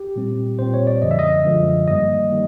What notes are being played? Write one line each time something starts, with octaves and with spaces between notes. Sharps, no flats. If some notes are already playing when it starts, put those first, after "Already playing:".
Already playing: G4
A#2 G3 C4
A#2 G3 C4 C5
C#5
D5
F#2 D3 F3 G#3 D#5
E5
D#5
F#2 D3 F3 G#3
G2 D#3 G3 A#3 D#5
D#3 G3 A#3